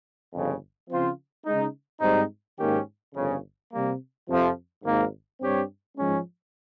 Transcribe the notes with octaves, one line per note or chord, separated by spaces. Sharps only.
G1 F2 C#3
C#3 F3 C4 F4 C5
C#3 G#3 D#4
G#2 G3 C4 D#4
G#2 D#3 A#3 C#4 G4
G1 F2 C#3
C3 G3 A#3
F2 C3 F3
G#1 G#2 D#3 A#3
G2 G3 C4 G4 C#5
G#2 F3 G#3 C#4